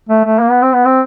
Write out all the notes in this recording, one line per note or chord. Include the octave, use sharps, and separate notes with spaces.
A3
A3
A#3
B3
C4
B3
C4